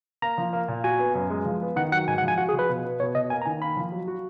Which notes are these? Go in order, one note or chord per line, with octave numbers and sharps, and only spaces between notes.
A#3 A#5
F3
A#3
A#2
F#4 G#5
B3
F#2
G#3
F3
B3
D#3 F#5
F#3 F#5
G#2 G#5
F#5
F3
G#5
F#4 F#5
G#4
F3
B4
B2
B3
B2 C#5
B2 D#5
A#3 G#5
A#5
D#3 G#5
A#3 B5
F3
F#3
F#4